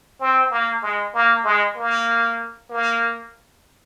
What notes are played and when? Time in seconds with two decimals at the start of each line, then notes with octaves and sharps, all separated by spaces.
0.20 C4
0.50 A#3
0.82 G#3
1.14 A#3
1.44 G#3
1.76 A#3
2.69 A#3